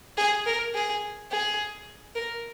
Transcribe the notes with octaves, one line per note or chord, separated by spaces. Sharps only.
G#4
A#4
G#4
G#4
A#4